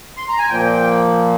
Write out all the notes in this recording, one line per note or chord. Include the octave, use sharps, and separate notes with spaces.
C6
A#5
G#5
A#2 F3 A#3 G5